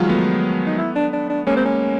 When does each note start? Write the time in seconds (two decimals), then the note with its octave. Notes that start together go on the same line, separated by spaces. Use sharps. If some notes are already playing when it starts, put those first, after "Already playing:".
Already playing: D#3 F3 F#3 G#3 F4
0.08 A3 B3
0.67 D#4
0.78 E4
0.95 D4
1.13 D4
1.29 D4
1.47 G#3 A#3 C#4
1.56 C4
1.65 C#4